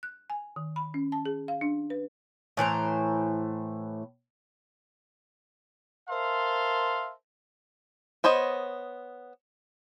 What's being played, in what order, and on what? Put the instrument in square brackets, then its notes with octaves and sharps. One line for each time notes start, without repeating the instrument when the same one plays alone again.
[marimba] F#6
G#5
D#3
B5
C#4
A5
G#4
F5
D4
B4
[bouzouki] A2 E3 C5 A#5
[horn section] A#4 C5 E5 F5 A5 C6
[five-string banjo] B3 C5 C#5 D#5